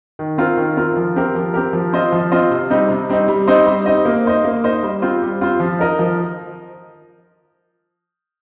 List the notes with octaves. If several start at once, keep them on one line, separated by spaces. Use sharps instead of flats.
D#3
C4 F4 A#4
D#3
C4 F4 A#4
F3
C4 G4 A#4
F3
C4 G4 A#4
F3
C4 F4 C5 D#5
F3
C4 F4 C5 D#5
C3
G3 C4 D#4
C3
G3 C4 D#4
G3
C4 D#4 C5 D#5
G3
C4 D#4 C5 D#5
A#3
D#4 C5 D#5
A#3
D#4 C5 D#5
G3
C4 F4 C5
G3
C4 F4 C5
F3
D#4 A#4 D#5
F3